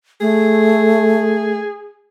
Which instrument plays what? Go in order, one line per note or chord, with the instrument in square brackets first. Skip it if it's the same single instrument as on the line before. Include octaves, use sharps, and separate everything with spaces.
[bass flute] A3 [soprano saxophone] G#4